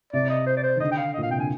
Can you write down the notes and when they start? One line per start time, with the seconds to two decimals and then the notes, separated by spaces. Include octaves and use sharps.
0.13 C3 D5
0.30 D#5
0.46 C5
0.57 D5
0.64 C5
0.76 D#3
0.80 D3 D#5
0.91 G5
0.97 F5
1.14 D#5
1.18 A#2 F5
1.29 C3 G5
1.38 D3 G#5